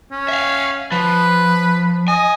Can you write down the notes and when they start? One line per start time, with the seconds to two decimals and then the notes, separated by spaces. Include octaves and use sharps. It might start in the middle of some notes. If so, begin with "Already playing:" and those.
0.11 C#4
0.29 E5 F5
0.92 F3 B4
2.08 D#5 G#5